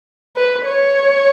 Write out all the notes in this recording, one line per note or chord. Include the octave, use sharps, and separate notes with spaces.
B4
C#5